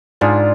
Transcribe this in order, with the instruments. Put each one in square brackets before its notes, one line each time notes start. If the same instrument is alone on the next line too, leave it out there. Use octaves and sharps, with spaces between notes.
[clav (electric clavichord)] G#2 [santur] D4 F4 G#4